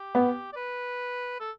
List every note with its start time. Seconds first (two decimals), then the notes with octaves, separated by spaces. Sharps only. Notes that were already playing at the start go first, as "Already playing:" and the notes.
Already playing: G4
0.15 B3
0.53 D5
0.56 B4
1.40 A4